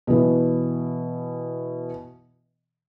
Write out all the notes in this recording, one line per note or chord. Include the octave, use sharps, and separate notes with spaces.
B2 E3